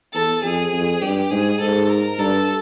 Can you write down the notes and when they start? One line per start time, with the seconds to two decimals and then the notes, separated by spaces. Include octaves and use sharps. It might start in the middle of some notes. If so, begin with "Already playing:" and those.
0.14 E2 A4
0.43 F2 G#4
0.73 F2
1.01 G2 G4
1.31 G#2 G#4
1.60 G#2 A4
1.89 A#4
2.19 G2 A4